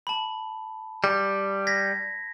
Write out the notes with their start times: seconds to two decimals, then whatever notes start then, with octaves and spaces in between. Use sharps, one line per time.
0.07 A5 B5
1.04 G3
1.67 G#6 A#6 B6